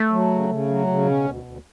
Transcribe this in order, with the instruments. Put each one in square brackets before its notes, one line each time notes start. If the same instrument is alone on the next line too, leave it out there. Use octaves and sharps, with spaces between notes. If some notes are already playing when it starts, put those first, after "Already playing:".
Already playing: [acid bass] A3
[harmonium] F#3
C#3
C#3
F#3
C#3
[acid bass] B2 [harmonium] C#4
[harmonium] D2
D2